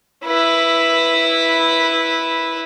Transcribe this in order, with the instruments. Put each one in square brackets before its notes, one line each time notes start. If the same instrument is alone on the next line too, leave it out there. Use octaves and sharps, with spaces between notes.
[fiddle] E4 B4